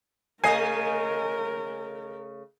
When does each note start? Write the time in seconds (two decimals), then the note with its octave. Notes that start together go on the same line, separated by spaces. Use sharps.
0.44 C#3 A3 A#4 D#5 G#5 C7